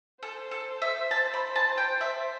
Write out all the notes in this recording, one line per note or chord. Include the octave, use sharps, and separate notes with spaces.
A4 C5
A4
E5
A5
B5
A5
G5
E5